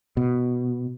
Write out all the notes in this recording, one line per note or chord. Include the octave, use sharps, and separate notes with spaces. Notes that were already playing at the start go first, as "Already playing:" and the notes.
B2